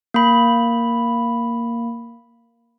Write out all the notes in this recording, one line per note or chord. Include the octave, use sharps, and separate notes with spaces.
A#3 B5